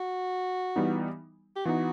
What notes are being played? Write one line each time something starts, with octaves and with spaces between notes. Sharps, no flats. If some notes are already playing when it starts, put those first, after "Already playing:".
Already playing: F#4
E3 G3 B3 D#4
G4
E3 B3 D#4 F#4